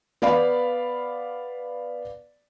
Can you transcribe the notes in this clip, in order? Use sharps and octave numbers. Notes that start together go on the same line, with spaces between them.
B3 D5 F5 B5